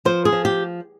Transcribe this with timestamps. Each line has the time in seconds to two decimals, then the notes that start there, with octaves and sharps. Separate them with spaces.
0.05 F3 C5
0.25 G#4
0.32 F3
0.45 G4